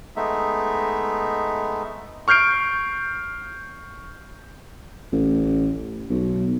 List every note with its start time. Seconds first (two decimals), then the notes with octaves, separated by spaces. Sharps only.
0.16 G#3 A3 B3 D#4 E5
2.28 C#6 F6 G6 C7 D7
5.12 A1
6.10 B1